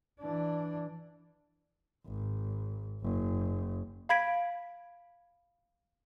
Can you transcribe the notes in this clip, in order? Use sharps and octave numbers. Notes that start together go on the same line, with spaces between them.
E3 D4
G#1
F#1
F5 B5 G#6 B6 D7